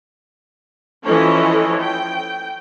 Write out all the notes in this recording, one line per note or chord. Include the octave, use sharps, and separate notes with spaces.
E3 F3 C#4 A4 C#5 D#5
G5